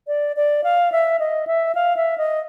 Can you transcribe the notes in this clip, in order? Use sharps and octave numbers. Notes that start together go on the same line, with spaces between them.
D5
D5
F5
E5
D#5
E5
F5
E5
D#5